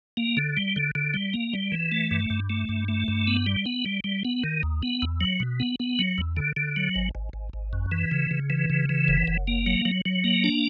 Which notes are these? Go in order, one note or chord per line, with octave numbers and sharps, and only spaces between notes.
A#3
D3
G3
D3
D3
G3
A#3
G3
E3
A3
G2
G2
A3
G2
A3
G2
B3
G3
B3
G3
G3
B3
D#3
D#2
B3
E2
F#3
B2
B3
B3
F#3
E2
D3
D3
F#3
G#1
G#1
G#1
G#1
F#2
E3
C#3
C#3
E3
C#3
E3
F#1
F#1
A#3
F#3
F#3
F#3
A#3
D4